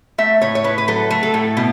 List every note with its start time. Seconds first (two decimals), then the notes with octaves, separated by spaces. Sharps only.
0.18 A3 E5
0.42 A2 C#5
0.55 C#5
0.64 A2 B4
0.78 B4
0.88 F#3 A4
1.10 A3
1.23 A4
1.34 A2
1.57 B2